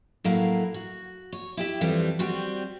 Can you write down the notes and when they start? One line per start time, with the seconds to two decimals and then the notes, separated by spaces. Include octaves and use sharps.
0.24 A2 F#3 A#3 E4 F5
0.74 F#4
1.33 C#5
1.57 E4 G4 E5
1.81 F2 E3 F3 G3
2.19 G3 C4 F#4